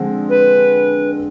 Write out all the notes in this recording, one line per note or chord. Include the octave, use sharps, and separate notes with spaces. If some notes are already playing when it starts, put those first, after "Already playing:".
Already playing: D3 F3 G#3 C4
B4